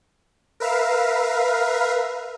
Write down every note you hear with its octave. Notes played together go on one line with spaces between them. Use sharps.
A#4 B4 E5 F5